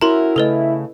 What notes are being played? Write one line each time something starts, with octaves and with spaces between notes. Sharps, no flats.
C#4 E4 F#4 A#4 A#5 C6
C#3 A3 A4 B4 D#5